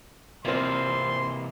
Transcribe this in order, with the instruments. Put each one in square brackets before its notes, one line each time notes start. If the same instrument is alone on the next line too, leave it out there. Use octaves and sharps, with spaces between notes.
[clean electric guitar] C3 E3 A#3 [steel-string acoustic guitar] C4 F4 [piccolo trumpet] C6